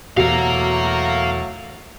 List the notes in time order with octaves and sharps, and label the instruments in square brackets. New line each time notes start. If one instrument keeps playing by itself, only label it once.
[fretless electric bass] E2 B2 [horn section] F#3 A3 [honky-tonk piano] F#4 [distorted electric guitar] F5 A#5